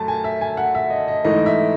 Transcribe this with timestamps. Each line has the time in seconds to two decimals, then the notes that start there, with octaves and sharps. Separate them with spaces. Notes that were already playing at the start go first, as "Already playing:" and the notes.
Already playing: F#2 A3 A5
0.08 G#5
0.24 E5
0.41 G#5
0.57 F#5
0.75 E5
0.90 D#5
1.08 D#5
1.24 G#2 E3 A3 D#5
1.46 E5